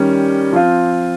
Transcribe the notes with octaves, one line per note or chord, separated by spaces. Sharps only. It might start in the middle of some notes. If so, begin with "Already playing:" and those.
Already playing: D#3 G3 C#4
F3 C4 F4